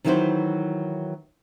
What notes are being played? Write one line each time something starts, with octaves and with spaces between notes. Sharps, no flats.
D#3 E3 F#3 E4 F#4 C5